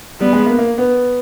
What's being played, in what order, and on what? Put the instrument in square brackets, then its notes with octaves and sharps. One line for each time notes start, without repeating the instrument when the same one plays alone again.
[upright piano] G3 [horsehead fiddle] B3
[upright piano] G#3
A#3
A#3
B3